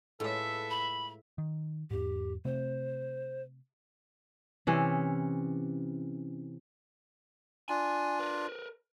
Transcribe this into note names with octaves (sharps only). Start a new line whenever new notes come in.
A2 G#3 F4 A4 B4 E5
B5
D#3
E2 G#2 G4
C3 A3 C4 C5
C3 E3 C#4
D4 F4 G#5
A#4 B4